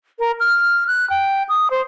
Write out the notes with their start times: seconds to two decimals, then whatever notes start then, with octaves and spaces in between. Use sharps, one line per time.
0.19 A#4
0.40 F6
0.87 F#6
1.10 G5
1.49 D#6
1.71 C5